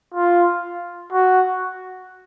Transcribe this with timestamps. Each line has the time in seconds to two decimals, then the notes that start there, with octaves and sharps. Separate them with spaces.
0.14 F4
1.12 F#4